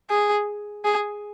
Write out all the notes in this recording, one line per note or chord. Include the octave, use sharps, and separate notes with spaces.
G#4
G#4